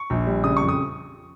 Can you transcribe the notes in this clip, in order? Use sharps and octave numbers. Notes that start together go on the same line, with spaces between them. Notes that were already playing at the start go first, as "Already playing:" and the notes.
Already playing: C#6
A#1
G3
C#3 D#6
F2 C#6
D#6